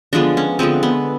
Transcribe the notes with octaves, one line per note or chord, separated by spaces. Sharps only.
D3 F3 G#3 B3 D4
C#4
D3 F3 G#3 B3 C4
B3